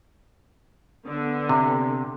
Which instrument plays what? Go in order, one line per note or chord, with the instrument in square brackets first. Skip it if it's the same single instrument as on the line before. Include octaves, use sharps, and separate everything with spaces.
[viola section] D3 B3
[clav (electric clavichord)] C3